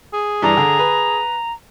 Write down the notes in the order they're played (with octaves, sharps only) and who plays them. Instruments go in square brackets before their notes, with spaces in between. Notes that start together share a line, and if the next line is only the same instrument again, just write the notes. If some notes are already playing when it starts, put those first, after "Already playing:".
[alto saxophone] G#4
[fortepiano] G2 E3 D5 [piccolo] A#5
[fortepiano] D3
B4